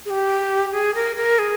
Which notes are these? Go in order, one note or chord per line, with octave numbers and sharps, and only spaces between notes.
G#4
G4
G#4
A#4
A#4
G#4